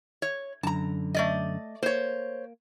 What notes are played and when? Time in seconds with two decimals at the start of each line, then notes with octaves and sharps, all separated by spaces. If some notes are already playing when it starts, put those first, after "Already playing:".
0.22 C#5
0.63 F#2 D3 A5 A#5
1.14 A3 D5 D#5
1.83 A#3 C5 C#5